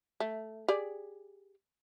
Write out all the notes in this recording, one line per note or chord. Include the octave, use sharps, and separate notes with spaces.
A3
G4 G#4 D5